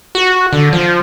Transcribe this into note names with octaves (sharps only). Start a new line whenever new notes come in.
F#4
D3
F3